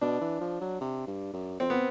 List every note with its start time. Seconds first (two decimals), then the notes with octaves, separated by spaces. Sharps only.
0.01 B2 D4
0.21 E3
0.41 F3
0.61 F#3
0.81 C3
1.07 G2
1.34 F#2
1.60 F2 C4
1.70 B3